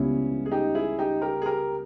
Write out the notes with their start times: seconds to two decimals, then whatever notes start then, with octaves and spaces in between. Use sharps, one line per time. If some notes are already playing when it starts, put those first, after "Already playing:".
Already playing: C#2 C#3 G3 B3 C#4 E4
0.46 G#4
0.51 D#4 G4
0.75 E4 G#4
0.99 D#4 G4
1.22 G4 A#4
1.42 G#4
1.46 G4 A#4